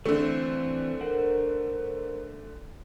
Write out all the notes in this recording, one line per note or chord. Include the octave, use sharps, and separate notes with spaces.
D3 E3 A3 C4 E6
A#4 C5 F#5